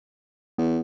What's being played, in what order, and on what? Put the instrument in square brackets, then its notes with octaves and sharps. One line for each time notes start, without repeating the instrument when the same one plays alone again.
[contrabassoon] E2 [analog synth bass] B3